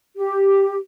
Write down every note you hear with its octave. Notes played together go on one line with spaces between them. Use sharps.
G4